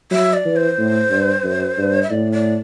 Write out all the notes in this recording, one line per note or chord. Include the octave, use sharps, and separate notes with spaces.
F#3 E5
D5
E3
C5
A2
G2
F#2
G2
E5
A2 D5
D5